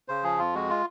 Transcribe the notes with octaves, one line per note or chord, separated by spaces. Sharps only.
C#3 C5
F3 G#4
F2 F4
G#3 F#4
F4